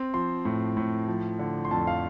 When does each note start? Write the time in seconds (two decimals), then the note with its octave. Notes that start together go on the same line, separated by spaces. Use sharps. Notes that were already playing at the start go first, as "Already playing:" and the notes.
Already playing: C4
0.14 F3 C6
0.45 A2
0.77 A2
1.08 F3
1.39 D3
1.65 C6
1.71 F2 A5
1.87 F5